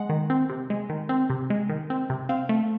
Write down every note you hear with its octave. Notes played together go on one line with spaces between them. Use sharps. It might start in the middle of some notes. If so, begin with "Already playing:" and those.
Already playing: G#3 F#5
D#3
C4
C3
G#3
D#3
C4
C3
G#3
D#3
C4
C3
C4 F5
A3